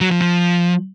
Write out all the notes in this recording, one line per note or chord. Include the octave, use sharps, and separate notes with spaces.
F#3
F3
F3